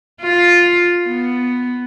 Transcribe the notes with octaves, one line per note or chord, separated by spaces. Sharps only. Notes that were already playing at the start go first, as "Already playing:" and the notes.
F4
B3